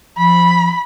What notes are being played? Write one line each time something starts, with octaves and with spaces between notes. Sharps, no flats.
F3 B5